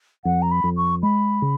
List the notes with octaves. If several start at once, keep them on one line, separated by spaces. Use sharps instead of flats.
F2 F#5
A#5
B5
F2
C#6
G#3 B5
C#3